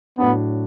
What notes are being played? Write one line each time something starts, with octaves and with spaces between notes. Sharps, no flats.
A2 F#3 B3 D4